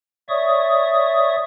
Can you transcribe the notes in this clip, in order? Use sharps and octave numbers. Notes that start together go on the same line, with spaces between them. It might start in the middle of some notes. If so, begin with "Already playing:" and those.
C#5 D5 E5 C#6 D#6